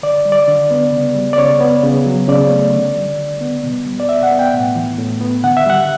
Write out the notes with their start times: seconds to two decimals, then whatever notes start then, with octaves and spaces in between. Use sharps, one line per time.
0.03 D3 D5
0.25 G3
0.32 D5
0.48 D3
0.71 B3
0.92 C#3
1.15 G3
1.33 D5
1.38 C#3 C#5
1.60 B3
1.83 C#3
2.06 F#3
2.28 C#3 D5
2.51 A3
2.73 D3
2.96 G3
3.18 D3
3.41 B3
3.64 B2
3.86 G3
4.00 D5
4.08 B2 E5
4.23 F#5
4.31 B3
4.39 G5
4.54 A2
4.75 E3
4.98 A2
5.21 B3
5.44 D3 F#5
5.57 E5
5.66 G3 F#5